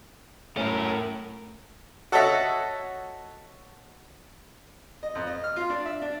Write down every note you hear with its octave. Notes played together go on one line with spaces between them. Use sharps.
A2 C#4 A#4
F#4 A4 C#5 D#5 E5 F#5
D#5
F2
D#5
F6
F4
D4
E5
D4